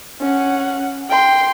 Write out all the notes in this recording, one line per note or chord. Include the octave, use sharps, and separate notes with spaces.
C#4 F#5
G5 C6